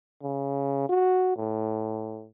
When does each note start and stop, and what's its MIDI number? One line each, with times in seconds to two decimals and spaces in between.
0.23 0.86 49
0.89 1.35 66
1.37 2.27 45